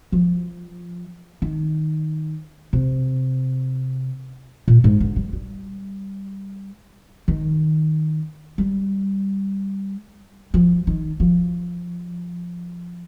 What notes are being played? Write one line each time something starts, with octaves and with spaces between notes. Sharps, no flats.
F3
D#3
C3
A#2
G#2
D3
G3
G3
D#3
G3
F3
D#3
F3